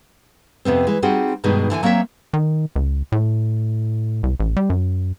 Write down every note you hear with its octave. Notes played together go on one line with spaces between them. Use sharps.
F2 C3 B3 C4
E3 G#3
G3 C4 D#4 F#4 G#4 C5
G2 B2 D#3 G#3 D#4
D3 E3 C#5 G#5
F#3 A#3 C4 C#5 E5
D#3
C#2
A2
C2
A1
G3
F#2